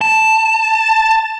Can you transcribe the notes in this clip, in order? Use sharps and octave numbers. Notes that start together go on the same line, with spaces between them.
A5